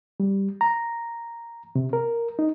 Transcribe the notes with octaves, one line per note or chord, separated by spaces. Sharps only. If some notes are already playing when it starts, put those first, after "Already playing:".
G3
A#5
C3
A#4
D#4